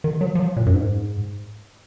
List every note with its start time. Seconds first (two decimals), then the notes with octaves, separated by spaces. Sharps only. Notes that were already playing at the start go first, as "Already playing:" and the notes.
0.04 D#3
0.21 F#3
0.35 F3
0.39 F#3
0.56 A#2
0.66 F#2
0.74 G#2